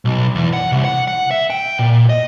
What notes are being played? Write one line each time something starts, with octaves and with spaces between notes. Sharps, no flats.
B1
E2
F#5
C2
F#5
F#5
E5
G5
A#2
D#5